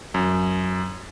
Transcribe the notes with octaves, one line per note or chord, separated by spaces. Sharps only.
F#2